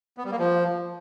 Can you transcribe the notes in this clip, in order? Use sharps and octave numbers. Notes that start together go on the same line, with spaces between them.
B3
G3
A#3
F3